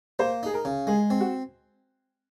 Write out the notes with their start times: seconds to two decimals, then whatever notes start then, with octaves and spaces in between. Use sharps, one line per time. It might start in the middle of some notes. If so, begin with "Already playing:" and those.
0.19 A#3 C5
0.43 D#4 G#4
0.54 A#4
0.65 C#3
0.87 G#3 G#4
1.10 C4
1.20 F#4